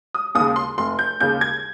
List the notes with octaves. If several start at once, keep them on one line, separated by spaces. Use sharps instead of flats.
D#6
D#2 C#3 D#6
C6
F1 C6
G6
D#2 C#3 G6
G#6